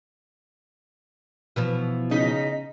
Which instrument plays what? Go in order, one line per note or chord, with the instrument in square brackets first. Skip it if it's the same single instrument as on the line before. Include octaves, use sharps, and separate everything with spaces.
[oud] B2 E3 F3
[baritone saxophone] C#3 [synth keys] D#4 B6 [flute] D#5